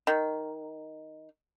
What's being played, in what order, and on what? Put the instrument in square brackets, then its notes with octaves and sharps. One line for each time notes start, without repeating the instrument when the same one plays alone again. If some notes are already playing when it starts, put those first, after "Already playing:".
[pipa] D#3